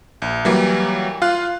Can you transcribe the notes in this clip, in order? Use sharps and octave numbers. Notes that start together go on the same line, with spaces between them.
A#1
E3 F#3 G3 A#3
F4 F5 F#6